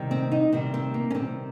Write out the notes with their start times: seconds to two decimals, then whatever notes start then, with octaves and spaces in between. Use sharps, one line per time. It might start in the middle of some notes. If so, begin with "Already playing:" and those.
Already playing: C3 D#3 G3
0.11 C4
0.32 D#4
0.52 C3 D#3 G3 C4
0.74 C4
0.94 A#3
1.11 C#4
1.15 C3 D#3 G3 C4